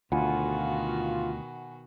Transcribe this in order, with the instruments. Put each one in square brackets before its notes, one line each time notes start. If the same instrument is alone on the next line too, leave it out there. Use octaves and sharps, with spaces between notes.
[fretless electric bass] D2 [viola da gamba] B2 D#3 F#4 [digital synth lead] F4 [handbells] F#5 G#5 B5